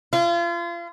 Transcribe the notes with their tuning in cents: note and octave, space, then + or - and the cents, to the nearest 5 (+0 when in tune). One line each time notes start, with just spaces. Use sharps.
F4 -35